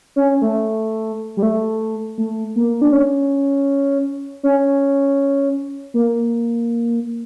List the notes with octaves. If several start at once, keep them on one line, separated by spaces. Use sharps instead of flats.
C#4
A3
G3
A3
A3
A#3
D4
C#4
C#4
A#3